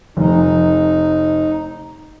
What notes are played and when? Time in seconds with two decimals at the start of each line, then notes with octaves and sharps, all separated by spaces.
0.17 F1 D#4